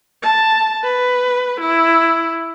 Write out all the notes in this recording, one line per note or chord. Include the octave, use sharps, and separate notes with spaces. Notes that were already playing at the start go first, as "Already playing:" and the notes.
A5
B4
E4